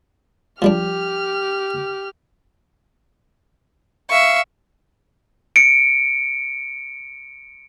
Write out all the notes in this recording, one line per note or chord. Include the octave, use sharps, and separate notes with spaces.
F3 G3 D4 G4 F6
E5 F5 C#6
C#7 D7